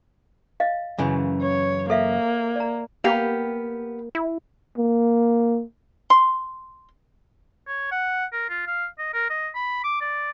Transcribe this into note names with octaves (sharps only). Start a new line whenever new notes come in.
D#5 F5
F#2 C#3 E3
C#5
A#3 A4 E5 F5
D5 A#5
A#3 B3 G4 F5
E4
A#3
C6
C#5
F#5
A#4
F4
F5
D#5
A#4
D#5
B5
D6
D5